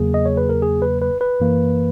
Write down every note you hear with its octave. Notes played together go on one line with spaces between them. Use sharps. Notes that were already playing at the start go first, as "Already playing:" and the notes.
Already playing: E2 C#3 F#3 A#3 G#4
D#5
C#5
B4
A#4
G#4
B4
B4
B4
F#2 E3 A#3